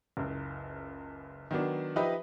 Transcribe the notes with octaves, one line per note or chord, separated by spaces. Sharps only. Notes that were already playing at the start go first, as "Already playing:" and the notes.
F#1 C#2
D#3 F#3 B3 D4
F3 D#4 G4 B4 D#5 E5